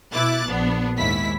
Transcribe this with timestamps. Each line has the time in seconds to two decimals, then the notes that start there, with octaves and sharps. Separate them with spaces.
0.12 B2 E4 D6 F#6 A6
0.47 A#1 B3 D4
0.97 D#2 G#2 E4 B6